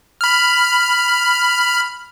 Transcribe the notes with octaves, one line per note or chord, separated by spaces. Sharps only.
B5 F6